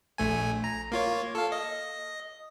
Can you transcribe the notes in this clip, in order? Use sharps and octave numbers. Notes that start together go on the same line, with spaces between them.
A#1 A3 G#5
A#5
A#3 F4 C#5
A4 F5
D#5